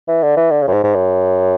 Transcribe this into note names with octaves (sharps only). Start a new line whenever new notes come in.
E3
D3
E3
D3
C#3
F#2
G#2
G#2
F#2